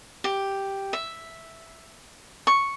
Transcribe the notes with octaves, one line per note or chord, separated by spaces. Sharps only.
G4
E5
C#6